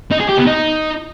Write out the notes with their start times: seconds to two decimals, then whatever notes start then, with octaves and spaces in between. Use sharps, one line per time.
0.11 D#4
0.20 G#4
0.29 G4
0.38 B3
0.47 D#4